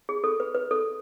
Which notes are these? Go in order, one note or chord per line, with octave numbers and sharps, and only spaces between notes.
G#4
A4
B4
B4
A4